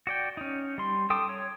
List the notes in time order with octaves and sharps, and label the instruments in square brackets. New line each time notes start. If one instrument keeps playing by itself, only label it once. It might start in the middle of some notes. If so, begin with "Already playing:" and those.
[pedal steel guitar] F#4 D5 G5
C#4 D#4
G3 C6
A4 G5 C6 D6 D#6
C#5